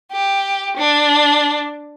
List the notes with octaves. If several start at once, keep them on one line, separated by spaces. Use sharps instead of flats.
G4
D4